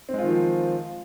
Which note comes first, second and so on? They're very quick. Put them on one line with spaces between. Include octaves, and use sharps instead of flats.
C4 G#3 F4 D#3 F3